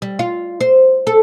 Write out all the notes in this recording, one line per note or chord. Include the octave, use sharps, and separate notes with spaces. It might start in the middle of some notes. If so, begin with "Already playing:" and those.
G3
F4
C5
A4